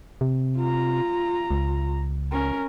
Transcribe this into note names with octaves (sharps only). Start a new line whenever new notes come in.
C3
F4 A#5
C#2
C#4 A#4